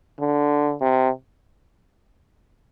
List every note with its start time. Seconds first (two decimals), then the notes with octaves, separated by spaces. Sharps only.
0.20 D3
0.81 C3